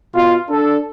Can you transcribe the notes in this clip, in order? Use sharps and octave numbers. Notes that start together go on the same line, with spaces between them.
B2 F4
D4 A4